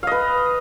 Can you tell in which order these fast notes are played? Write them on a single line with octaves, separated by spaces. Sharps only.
F5 D#5 B4